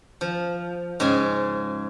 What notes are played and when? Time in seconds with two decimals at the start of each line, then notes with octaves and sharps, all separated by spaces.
0.21 F3
1.00 G#2 C#3 G#4 G#5